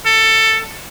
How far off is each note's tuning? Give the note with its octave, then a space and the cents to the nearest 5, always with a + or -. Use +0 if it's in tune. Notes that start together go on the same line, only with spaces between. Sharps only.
A4 +15